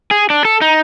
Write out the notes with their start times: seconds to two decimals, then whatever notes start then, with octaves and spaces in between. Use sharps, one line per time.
0.11 G#4
0.30 D4
0.45 A4
0.61 D#4